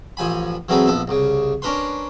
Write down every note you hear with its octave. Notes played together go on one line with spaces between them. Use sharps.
A1 F3 G#5 B5
E3 F#3 C4 G#4 A4 B4
A#1 B3 A4
C2 C#3
C#4 D4 A#4 B4 C6